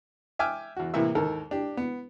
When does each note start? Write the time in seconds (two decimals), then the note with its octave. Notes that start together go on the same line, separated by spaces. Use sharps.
0.39 E5 G5 G#5 D6 F6
0.77 E2 F#4
0.94 A2 C3 E3 A#3 E5 E6
1.15 D#2 G#2 A4 A#4
1.51 D4 G4
1.77 B3